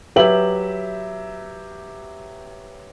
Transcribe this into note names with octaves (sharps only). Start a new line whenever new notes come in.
F#3 G4 B4 E5 F#7